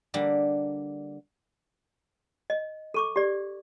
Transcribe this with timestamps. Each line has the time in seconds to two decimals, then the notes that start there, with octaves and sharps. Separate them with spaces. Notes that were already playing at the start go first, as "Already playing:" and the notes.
0.14 D3 G3 A#3
2.50 D#5
2.94 A4 C#6 D6
3.16 G4 D5